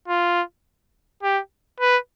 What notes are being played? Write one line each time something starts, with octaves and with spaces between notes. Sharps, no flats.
F4
G4
B4